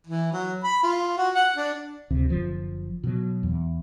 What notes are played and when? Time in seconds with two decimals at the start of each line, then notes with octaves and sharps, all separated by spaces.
0.07 E3
0.32 F#3
0.64 B5
0.83 F4
1.18 F#4
1.35 F#5
1.56 D4
2.10 D1 D2 C3
2.30 F#1 D3 F3
3.04 B2 F#3
3.43 E2